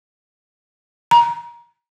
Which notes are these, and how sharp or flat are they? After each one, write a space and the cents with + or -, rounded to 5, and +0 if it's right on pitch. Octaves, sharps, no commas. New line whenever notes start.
A#5 +25